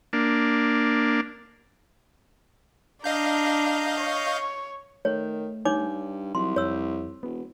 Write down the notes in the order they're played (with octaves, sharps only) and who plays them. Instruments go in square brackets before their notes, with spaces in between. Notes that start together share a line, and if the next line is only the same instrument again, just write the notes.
[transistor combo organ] A#3 D4
[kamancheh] D4 A#5 [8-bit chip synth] D#5 F5 G6
[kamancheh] C#5
[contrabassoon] D#3 [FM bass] A3 [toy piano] C#5
[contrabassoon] G2 [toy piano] D#4 C#5 D6
[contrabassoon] C2 [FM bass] F#3 [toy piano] C6
[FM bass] F2 [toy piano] C#5 E6
[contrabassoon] E1 [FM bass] B3